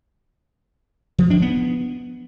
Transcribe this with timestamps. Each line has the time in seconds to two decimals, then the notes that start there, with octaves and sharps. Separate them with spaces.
1.19 F3
1.30 D4
1.42 B3